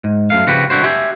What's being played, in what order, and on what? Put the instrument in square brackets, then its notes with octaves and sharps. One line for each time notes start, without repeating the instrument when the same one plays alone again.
[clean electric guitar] G#2
F#2 A3 F5
C#3 F3 F#4 G4 B4
C2 D3 E4 F#4 C5
G4 E5 G#5